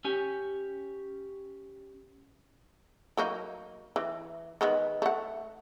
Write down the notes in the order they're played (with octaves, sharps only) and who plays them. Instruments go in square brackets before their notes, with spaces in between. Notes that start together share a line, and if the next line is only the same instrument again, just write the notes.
[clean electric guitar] C#4 G4 G#5
[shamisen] F#3 A#3 D#4
E3
D#3 G#3 B3
A3 F#5